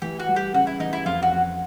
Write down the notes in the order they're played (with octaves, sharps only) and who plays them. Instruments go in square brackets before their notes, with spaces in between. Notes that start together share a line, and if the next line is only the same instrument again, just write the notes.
[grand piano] E3 [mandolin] G4
[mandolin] F#4
[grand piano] G3
[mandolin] G4
[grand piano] C#3 [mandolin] F#4
[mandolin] E4
[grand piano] E3 [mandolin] D#4
[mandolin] E4
[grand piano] F2 [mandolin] F4
[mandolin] F#4
[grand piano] F2